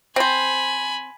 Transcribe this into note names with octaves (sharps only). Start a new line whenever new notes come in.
C4 C5 G#5 B5